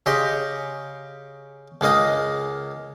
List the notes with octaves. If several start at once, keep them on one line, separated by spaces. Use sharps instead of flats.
C#3 G4 D#5 C6
C#2 G#3 A#3 D#5 D#6